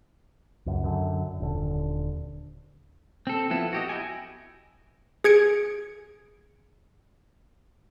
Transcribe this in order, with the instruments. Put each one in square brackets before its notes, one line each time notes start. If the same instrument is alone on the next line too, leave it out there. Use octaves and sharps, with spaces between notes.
[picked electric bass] C#2 F#2
F#2 D3
D#1 D3
[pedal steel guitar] C4 A4
F3 B3 E4 A4
F#4 G4 D#5
E4 G5 G#5
[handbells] G#4 G#6 C#7 D7